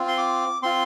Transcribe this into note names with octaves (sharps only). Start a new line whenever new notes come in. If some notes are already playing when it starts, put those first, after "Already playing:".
Already playing: C4 F4
C6
D6
C4 F4 C6